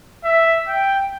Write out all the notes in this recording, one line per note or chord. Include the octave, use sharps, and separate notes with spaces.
E5
G5